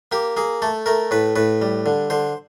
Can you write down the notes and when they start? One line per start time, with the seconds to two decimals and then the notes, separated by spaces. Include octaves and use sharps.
0.12 A#3 G4
0.37 A#3 G#4
0.62 A3 A4
0.86 A3 A#4
1.11 A2 B4
1.36 A2 B4
1.62 G3
1.86 D3
2.10 D3 C5